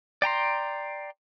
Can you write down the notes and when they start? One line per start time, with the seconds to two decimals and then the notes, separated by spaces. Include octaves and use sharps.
0.22 D5 G5 A#5 C6